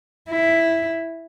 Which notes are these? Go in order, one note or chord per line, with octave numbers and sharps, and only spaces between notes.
E4